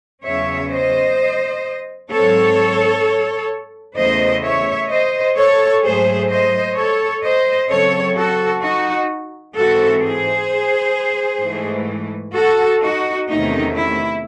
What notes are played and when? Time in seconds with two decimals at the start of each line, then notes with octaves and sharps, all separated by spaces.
0.24 E2 C#3 F#3 C#4 C#5 E5
0.71 C5 D#5
2.10 G#2 F#3 C4 A4 C#5
3.97 E2 C#3 E3 A3 C5 D#5
4.43 C#5 E5
4.90 C5 D#5
5.36 A4 C#5
5.83 G#2 F#3 A3 G#4 C5
6.29 C5 D#5
6.76 A4 C#5
7.22 C5 D#5
7.69 C#3 F#3 C4 A4 C#5
8.16 F#4 A4
8.62 D#4 F#4
9.55 G#2 E3 C4 F#4 A4
10.01 G#4 C5
11.42 G#2 E3 A3
12.34 F#4 A4
12.81 D#4 F#4
13.28 E2 C3 D#3 A3 C#4 D#4
13.75 E4